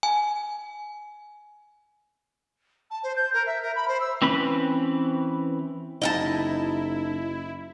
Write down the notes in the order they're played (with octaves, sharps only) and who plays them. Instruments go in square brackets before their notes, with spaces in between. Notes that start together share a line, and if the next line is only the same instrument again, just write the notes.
[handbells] G#5
[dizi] A5
C5
G6
A#4
E5
A#4
B5
C5
E6
[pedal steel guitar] E3 C4 C#4 B4 B5
[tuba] F#1 [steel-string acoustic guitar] D#4 [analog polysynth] E4 [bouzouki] D#5 F5 A5